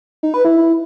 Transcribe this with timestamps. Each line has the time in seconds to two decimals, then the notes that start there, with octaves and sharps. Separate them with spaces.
0.23 D#4
0.34 B4
0.45 E4